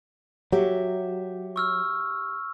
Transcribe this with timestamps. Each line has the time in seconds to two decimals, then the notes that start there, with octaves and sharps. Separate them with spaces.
0.52 F#3 G4 E5
1.56 C#6 E6 F6